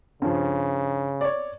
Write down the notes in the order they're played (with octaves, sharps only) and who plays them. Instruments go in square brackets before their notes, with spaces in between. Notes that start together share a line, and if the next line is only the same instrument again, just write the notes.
[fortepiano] G2 F3 [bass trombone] C#3
[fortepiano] C#5 D5